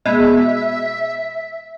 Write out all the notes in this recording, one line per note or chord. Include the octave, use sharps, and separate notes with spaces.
B2 G#3 E5